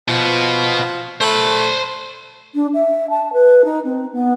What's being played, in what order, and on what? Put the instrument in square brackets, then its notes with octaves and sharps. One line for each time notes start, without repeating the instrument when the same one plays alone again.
[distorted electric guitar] B2 B3 [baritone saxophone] F3
[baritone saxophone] A3 [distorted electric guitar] C5 B5
[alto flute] D4
E5
A5
B4
D#4
C4
B3